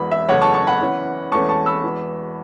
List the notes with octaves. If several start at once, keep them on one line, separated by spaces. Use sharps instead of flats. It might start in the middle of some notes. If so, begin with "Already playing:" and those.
Already playing: E1 E2 E3 B5
E5
F#1 E2 C#3 A3 C#5 F#5
A5 C#6
A5 C#6
F#5 B5
E2 E3 C#4
E1 E2 E3 A3 C#4 A5 C#6
A5 C#6
B5 E6
E1 E2 E3